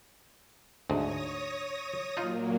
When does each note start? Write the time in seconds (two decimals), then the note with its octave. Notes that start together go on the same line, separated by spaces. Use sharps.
0.90 D2 G#2 C#5 D#6 A#6
2.17 A#2 F#3 A#3 D#4 F4